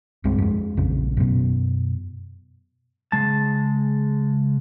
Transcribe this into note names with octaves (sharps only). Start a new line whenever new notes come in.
C2 G2 G#3 C4
F2 G#3
D#1 A#1 F2 C#3
F#2 B2
C#3 G#3 A5